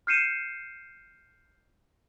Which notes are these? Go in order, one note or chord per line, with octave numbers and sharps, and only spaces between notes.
F6 G6 C7 C#7 D#7 E7